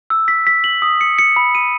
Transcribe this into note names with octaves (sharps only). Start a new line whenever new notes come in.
E6
B6
B6
F#7
D#6
C#7
C#7
B5
D#7